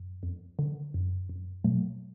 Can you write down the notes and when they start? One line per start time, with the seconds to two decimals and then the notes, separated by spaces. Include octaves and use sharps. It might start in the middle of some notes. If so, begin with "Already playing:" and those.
Already playing: F#2
0.23 F2
0.59 D3
0.94 F#2
1.29 F#2
1.64 B2 F#3 A3